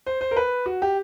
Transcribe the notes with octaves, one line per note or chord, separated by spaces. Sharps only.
C5
C5
A#4
B4
F#4
G4